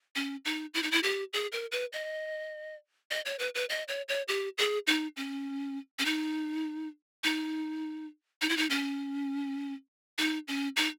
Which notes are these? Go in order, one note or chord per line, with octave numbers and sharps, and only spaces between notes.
C#4
D#4
E4
D#4
E4
G4
G#4
A#4
B4
D#5
D#5
C#5
B4
B4
D#5
C#5
C#5
G4
G#4
D#4
C#4
C#4
D#4
D#4
D#4
E4
D#4
C#4
D#4
C#4
D#4